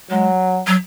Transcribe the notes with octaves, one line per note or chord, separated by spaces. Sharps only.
F#3 G#3
F#3